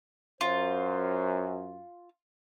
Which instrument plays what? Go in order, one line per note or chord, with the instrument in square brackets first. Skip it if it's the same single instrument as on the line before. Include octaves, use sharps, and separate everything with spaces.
[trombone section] F#2 [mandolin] F4 [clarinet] C5